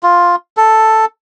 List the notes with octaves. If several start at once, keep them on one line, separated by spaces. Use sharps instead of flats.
F4
A4